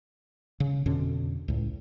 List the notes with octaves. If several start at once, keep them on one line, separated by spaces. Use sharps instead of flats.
C#3
F2 B2 D3 C#4
C#2 A2